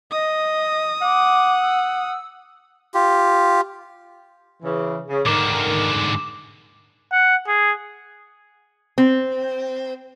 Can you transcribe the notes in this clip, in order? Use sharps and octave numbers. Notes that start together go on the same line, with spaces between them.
D#5 D#6
F#5 D6
E6
F4 G4
C#3 E3
C#3
G#2 D3 D#3 A#4 D6 E7
F#5
G#4
C4